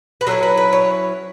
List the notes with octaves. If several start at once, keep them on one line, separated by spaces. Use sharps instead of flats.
B4
F#3 C#4 E4 A4
B4
B4
C#5